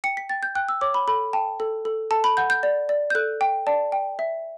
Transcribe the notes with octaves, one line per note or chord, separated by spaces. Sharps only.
G5 C#7
B6
G5 A6
G6
G5 F#6
E6
C#5 D6
B5
A4 B5
G5 A5
A4
A4
A4 A5
B5
F#5 G6
G6
D5
D5
G6
A4 F#6
G5
D5 A5
G5
E5